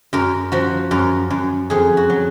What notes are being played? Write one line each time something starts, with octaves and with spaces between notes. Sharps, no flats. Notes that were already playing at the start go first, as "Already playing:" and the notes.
F#2 A#4
F3 F#4
F#2 A#4
F#2
F2 G#4
F#4
F#3